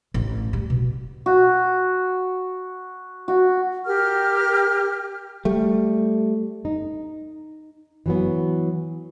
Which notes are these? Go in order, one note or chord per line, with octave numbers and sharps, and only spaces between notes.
A1
G3
B2
F#4
F#4
G4 A#4 F6
G3 A3
D#4
E3 F#3 B3